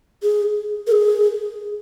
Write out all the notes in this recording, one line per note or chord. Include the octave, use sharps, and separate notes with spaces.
G#4
A#4
G#4